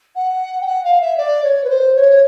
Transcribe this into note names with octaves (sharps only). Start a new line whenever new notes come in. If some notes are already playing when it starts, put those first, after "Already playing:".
F#5
G5
F#5
F5
E5
D5
C#5
B4
C5
C#5